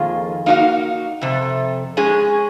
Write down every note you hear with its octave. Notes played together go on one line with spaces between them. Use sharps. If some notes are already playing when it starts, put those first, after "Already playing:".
Already playing: F2 D#3 A#3 F4 G#4
A#3 D#4 F#4 C#5 F5
F2 C3
G#3 C#4 G#4